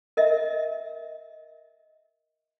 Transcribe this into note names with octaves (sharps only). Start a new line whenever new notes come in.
A#4 D#5 E5